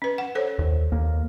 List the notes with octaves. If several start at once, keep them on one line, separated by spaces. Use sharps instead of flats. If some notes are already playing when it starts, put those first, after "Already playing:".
C#4 B4
F#5
A4 C5 C#5
D#2
D#2 A#3